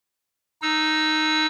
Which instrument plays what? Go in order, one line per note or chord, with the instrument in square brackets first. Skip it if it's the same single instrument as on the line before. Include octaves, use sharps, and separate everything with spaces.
[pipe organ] D#4 E6